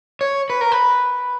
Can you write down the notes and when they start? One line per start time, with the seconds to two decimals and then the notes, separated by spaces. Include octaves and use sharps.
0.21 C#5
0.50 B4
0.61 A#4
0.72 B4